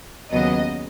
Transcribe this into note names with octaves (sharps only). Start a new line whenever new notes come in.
D#2 C#3 F#3 B3 D#5